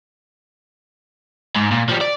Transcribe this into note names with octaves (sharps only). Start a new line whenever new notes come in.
G#2
A#2
F3 G3
D5